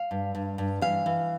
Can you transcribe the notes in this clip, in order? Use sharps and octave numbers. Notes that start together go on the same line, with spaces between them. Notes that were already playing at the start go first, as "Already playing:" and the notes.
Already playing: F5
G2
G2
G2
E3 F5
E3